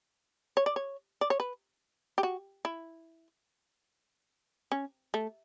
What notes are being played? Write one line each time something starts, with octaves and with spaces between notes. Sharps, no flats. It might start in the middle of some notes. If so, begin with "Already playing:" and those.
C#5
D5
C#5
D5
C#5
B4
G4
F#4
E4
C#4
A3